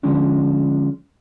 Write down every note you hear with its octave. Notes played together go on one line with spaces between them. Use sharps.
D3 F3 G#3 C#4 D4